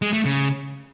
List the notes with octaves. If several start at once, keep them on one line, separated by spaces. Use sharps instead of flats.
G#3
A3
C#3